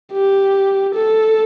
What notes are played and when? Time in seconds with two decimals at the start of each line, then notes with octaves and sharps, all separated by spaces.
0.13 G4
0.95 A4